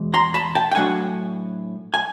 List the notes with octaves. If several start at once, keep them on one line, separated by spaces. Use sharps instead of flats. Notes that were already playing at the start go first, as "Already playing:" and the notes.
Already playing: E2 B2 G#3
A#5 C6
A5 B5
G5 A5
G5
A2 F#3 A3 D4 F#5 G#5
G#5